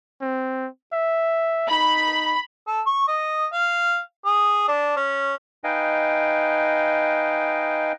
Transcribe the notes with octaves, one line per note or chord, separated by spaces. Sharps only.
C4
E5
D#4 B5
A4
C#6
D#5
F5
G#4
D4
C#4
D#4 B4 D#5 F5 G5 G#5